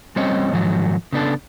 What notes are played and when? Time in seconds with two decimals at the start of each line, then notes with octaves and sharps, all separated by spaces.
0.16 G3 C4 C#4 C5 C#5 D#5
0.52 G#2 D#3 F3 F#3
1.12 C#3 B3 D4 A4